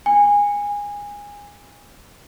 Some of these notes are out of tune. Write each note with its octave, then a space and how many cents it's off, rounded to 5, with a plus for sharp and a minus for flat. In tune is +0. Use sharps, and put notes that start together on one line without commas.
G#5 -20